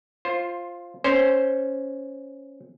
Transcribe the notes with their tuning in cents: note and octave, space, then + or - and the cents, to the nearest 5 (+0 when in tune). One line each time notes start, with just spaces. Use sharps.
F4 +0 C5 +20
C#4 +0 C5 +0